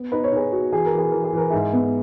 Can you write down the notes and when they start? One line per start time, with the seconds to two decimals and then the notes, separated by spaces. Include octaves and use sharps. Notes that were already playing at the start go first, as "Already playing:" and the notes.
Already playing: B3
0.12 D#4 B4
0.24 C#5
0.32 D#4 G#4 B4
0.52 F#4
0.72 E3 G#4
0.85 A#4
0.92 E3
0.98 G#4
1.12 E3 A#4
1.24 G#4
1.33 E3 A#4
1.50 G#2 E4 G#4
1.73 B3